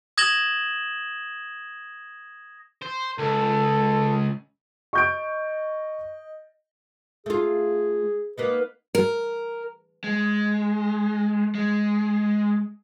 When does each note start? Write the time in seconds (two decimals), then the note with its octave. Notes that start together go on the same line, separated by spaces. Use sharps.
0.17 D#6 G#6 A#6 E7 F#7 G7
2.82 C5
3.19 C#2 A4
4.93 D#5 C#6 G6 D7
7.26 A3 F4 G#4
8.38 A#3 B3 D#4 B4
8.95 A#4
10.04 G#3
11.55 G#3